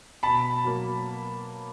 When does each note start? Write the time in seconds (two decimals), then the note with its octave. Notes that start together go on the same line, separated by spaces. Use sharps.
0.23 B2 A5 B5
0.65 F#3 A#3